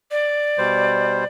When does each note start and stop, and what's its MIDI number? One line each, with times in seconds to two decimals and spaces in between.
0.11 1.26 74
0.58 1.24 47
0.58 1.24 55
0.58 1.24 72